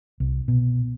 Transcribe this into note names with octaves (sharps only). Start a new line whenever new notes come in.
C2
B2